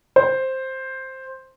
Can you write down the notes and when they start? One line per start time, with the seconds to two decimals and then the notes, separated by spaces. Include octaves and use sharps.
0.16 C5